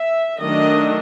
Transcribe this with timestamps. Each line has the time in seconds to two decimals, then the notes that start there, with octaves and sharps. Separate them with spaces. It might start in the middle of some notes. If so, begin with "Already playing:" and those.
Already playing: E5
0.40 D#3 F#3 A3 D4 D#5